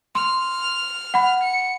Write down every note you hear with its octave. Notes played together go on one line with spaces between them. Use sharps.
C6 F6
F#5 B5
C#7